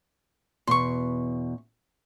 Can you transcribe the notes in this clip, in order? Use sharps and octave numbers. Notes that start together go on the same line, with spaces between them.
E2 B2 C6 C#6